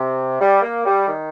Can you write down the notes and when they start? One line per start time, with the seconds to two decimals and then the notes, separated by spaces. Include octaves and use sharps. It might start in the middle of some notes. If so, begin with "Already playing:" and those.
Already playing: C3
0.39 G3
0.62 A#3
0.85 G3
1.06 D#3